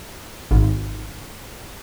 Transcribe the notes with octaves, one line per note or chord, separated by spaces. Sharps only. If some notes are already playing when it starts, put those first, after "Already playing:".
G#1